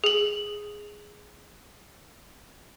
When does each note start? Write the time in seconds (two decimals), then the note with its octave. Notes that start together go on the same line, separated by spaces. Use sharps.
0.04 G#4 F#7